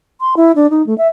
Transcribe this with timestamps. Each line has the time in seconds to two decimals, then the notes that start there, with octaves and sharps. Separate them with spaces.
0.21 C6
0.37 E4
0.56 D4
0.70 D#4
0.87 A3
0.98 E5